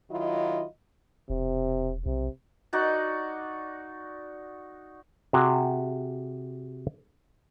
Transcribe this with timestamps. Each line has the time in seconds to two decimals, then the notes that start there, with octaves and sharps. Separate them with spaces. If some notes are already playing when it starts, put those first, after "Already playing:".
0.11 D#3 F#3 E4 F4 D#5
1.30 E1 C3
2.06 B1 C3
2.73 D#4 F#4 D5
5.33 C3 F#4 G#4